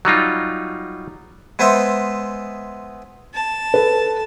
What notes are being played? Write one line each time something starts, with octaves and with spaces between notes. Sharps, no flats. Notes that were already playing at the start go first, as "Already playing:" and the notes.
F#3 G3 D#4 F4
G#3 B3 B4 C5 E5
A5
A4 B4